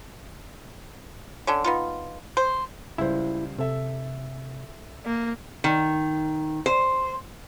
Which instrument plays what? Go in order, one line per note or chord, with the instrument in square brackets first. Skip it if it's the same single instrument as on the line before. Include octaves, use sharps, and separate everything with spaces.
[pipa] D3 C#4
B3 D#4 F4
C5
[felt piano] C#2 G3 C5 [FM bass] E4
[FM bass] C3 [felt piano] A4 E5
[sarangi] A#3
[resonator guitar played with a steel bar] D#3
C5